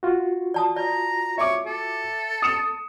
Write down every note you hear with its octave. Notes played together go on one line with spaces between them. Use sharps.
F4 F#4
D5 A5 D#6
D5 A#5
C#5 E5 D6
A4
D#6 C#7 E7